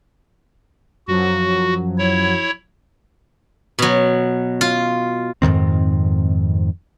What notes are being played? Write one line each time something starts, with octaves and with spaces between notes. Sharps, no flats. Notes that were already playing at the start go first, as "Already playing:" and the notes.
F#2 F3 F#3 F#4
E4 C#5
B2 F#3
F4
F2 G#2 D#3 C4